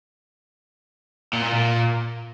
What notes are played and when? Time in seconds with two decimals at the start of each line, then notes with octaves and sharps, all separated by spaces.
1.33 A#2
1.43 A#2
1.54 A#2